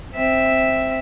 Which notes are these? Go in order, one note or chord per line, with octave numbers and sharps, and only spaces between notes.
C4 E5